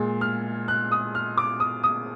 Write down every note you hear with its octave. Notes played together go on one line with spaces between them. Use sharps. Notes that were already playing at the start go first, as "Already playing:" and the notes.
Already playing: A#2 G#3
F6
F#6
D#6
F6
D6
D#6
D#6